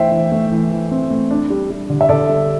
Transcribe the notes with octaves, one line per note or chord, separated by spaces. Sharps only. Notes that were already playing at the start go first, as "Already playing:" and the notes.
Already playing: E3 A3 C5 E5 G5
E3
A3
E3
E3
C4
A3
D4
G3
G3
D3
E5
D3 A4 D5
G3